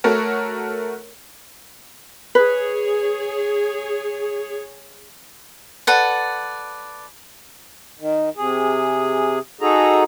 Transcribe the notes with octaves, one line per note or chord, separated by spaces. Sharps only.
A3 F#4 A4 A#4 C#5
G#4 B4 C#5
A4 B4 D5 F#5
D#3
C3 G#4
D#4 F#4 G#4 A4 A#5